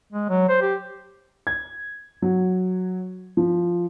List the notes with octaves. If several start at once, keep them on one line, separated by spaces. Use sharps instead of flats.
G#3
F#3
C5
G4
G#6
F#3
F3